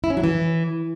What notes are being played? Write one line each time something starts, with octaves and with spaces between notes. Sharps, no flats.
E4
C#4
F#3
E3